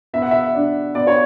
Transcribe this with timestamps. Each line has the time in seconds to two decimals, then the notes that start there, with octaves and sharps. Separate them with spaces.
0.13 B3 E5
0.22 F#5
0.31 E5
0.54 D4
0.95 B3 D5
1.07 C#5